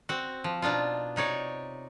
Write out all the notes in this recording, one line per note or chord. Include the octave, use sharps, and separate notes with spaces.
C4 F#4
F3
B2 D4 D#4 F4
C3 D#4 C#5 D5